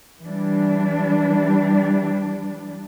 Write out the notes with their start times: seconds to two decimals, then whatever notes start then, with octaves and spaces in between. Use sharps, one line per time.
0.22 E3 G3 D4